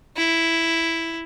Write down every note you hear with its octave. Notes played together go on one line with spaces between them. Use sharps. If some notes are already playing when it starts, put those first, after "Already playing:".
E4